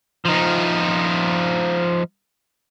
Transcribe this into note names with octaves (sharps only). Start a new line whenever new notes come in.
F3 D#4